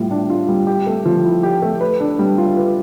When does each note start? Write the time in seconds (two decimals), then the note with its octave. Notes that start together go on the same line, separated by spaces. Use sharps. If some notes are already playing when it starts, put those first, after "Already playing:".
Already playing: A2 G3 F4
0.11 D4
0.30 F4
0.48 G3
0.67 G4
0.87 A3
1.05 F3
1.25 E4
1.43 G4
1.62 A3
1.81 B4
2.00 D4
2.19 G3
2.38 F4
2.57 B4